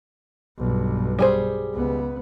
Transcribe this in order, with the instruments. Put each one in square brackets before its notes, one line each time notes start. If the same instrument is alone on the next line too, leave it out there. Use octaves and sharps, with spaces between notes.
[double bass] B1 G2
[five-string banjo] G3 G#4 C5
[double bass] C#2 B3